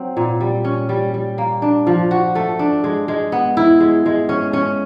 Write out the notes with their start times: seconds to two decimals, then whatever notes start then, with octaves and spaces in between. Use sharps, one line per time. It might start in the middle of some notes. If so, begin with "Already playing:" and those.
Already playing: F#3 C4
0.17 A#2
0.40 G3
0.64 C#4
0.89 G3
1.14 G3
1.38 A#3
1.62 D4
1.87 F3
2.11 F#4
2.35 A3
2.59 D4
2.84 G#3
3.08 G#3
3.32 B3
3.57 E4
3.80 G#3
4.06 G#3
4.29 C#4
4.53 C#4